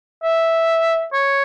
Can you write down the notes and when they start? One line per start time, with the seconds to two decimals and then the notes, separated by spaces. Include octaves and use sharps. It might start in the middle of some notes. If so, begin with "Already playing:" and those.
0.23 E5
1.13 C#5